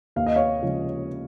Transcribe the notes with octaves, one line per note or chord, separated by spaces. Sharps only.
D#2 F5
D#5
C#5 F5
C#3 F3 G#3 C#4